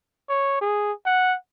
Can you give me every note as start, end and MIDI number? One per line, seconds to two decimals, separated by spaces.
0.29 0.60 73
0.61 0.92 68
1.06 1.35 78